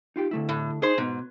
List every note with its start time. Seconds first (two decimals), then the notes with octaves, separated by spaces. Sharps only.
0.16 D#4 F4 G4
0.31 D3 A3 E4
0.49 A2
0.82 D#4 G#4 C5
0.98 G#2 B2 B3